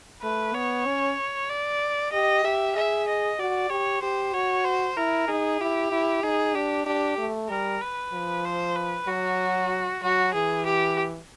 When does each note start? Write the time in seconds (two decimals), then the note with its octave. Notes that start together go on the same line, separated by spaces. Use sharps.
0.23 A3 B4
0.54 B3 C#5
0.86 C#4
1.49 D5
2.13 G4 D#5
2.44 G4 E5
2.76 G#4 E5
3.08 D#5
3.39 F#4 D5
3.70 G4 C#5
4.03 G4 C5
4.34 F#4 C#5
4.65 C5
4.97 E4 A#4
5.28 D#4 G#4
5.61 E4 G4
5.92 E4
6.24 D#4 G#4
6.55 D4 G4
6.86 D4 G4
7.18 A3
7.49 G3 A#4
7.82 B4
8.13 F3
8.45 C5
8.76 B4
9.07 F#3 F#4
10.02 F#3 F#4
10.34 E3 G#4
10.66 G4